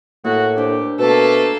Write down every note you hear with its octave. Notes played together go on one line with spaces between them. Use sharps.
A2 A#3 F#4 A#4
D4 G4 A#4 C5
B2 A3 A#3 A4